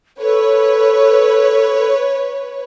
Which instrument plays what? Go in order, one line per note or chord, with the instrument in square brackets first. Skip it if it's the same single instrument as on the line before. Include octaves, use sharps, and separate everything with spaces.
[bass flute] A4 [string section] B4 C#5